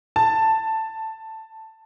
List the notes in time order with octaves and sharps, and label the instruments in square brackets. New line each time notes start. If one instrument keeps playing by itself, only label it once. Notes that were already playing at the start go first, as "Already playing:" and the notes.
[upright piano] A5